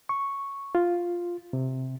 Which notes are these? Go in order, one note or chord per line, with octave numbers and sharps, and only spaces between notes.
C#6
F4
C3